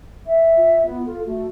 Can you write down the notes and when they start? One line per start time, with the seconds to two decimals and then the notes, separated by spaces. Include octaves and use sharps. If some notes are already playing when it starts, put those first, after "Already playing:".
0.26 E5
0.57 F4
0.86 B3
1.06 F4 A4
1.26 A3 F#4